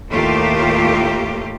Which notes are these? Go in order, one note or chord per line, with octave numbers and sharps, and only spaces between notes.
D#2 A2 A3 A#3 F4 G4